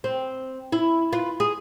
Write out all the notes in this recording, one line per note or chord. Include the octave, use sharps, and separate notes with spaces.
C4
E4
F4 B4
G#4